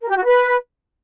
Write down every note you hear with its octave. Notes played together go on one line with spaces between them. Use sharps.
A#4
G4
F#4
B4